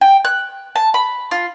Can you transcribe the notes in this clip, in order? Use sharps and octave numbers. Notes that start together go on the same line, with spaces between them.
G5
F#6
A5
B5
F4